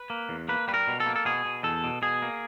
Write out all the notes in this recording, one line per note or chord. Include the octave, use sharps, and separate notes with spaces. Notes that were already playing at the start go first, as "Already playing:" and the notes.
Already playing: B4
A#3
E2
A#3 B4
G3 B4
A#4
B2
A4
A#3
A4
B2 G#4
B2
E2 A4
B2
B2 G#4
A#3